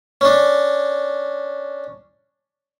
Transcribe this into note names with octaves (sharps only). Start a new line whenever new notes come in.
C#4 D4